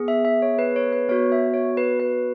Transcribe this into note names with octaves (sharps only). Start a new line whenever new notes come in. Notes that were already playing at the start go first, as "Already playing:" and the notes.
Already playing: B3 G#4
E5
E5
C#5
B4
C#5
B4
B3 F#4 C#5
E5
C#5
B4
B4